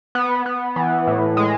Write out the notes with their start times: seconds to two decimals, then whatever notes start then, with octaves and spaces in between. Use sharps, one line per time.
0.15 B3
0.46 B3
0.76 E3
1.07 A2
1.37 G#3